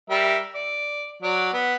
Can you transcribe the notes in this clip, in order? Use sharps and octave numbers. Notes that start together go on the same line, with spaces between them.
G3 A#4 E5
D5
F#3 D5
B3